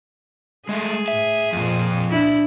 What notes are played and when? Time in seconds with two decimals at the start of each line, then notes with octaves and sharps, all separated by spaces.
0.69 G#3 A3 G#4
1.08 A2 E5
1.53 F2 A#2 F3
2.10 D4 E4